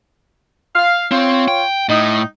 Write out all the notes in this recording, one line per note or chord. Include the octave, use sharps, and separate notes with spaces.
F5
C4 F4 C#5
G5
A2 D#4